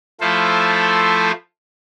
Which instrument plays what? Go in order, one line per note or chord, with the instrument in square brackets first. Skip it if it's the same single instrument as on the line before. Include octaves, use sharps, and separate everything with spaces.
[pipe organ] F3 A3 E4 F4 A4 C5